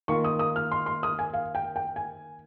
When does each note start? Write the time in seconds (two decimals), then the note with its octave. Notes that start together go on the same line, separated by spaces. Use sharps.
0.08 D#3 A#3 F4 C#6
0.24 D#6
0.39 D#6
0.56 F6
0.72 C6
0.86 C6
1.03 D#6
1.19 G#5
1.34 F5
1.55 G5
1.76 G5
1.96 G#5